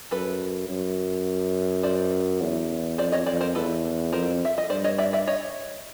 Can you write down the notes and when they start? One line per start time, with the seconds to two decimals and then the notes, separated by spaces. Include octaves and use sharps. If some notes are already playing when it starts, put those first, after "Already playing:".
0.11 F#2 A4 B4
0.69 F#2
1.83 C5 D5
2.41 E2
2.98 F2 C5 D5
3.12 C#5 D#5
3.26 F2 C5 D5
3.41 A#4 C5
3.55 E2 A4 B4
4.13 F2 A#4 C5
4.45 E5
4.58 D#5
4.70 G2 C5 D5
4.84 C#5 D#5
4.98 D5 E5
5.13 D5 E5
5.28 C#5 D#5